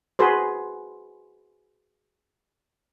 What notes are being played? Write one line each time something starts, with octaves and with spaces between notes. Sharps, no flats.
F#4 G#4 B4 C5